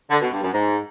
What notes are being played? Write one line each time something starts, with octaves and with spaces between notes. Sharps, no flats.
D3
B2
G2
F#2
G#2